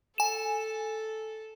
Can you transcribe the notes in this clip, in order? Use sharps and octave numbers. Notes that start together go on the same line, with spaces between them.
A4 G#5 E7